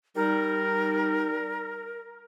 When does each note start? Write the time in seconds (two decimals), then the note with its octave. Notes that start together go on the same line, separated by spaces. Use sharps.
0.16 G3 D#4 A#4